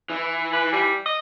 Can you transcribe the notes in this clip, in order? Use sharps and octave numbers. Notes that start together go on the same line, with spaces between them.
E3
B4
G3
D#5